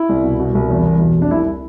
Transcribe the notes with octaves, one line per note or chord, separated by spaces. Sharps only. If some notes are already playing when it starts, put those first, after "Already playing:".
Already playing: E4
C2
B2
B2
C2
E2
E2
B2
F1
D4
C2 E4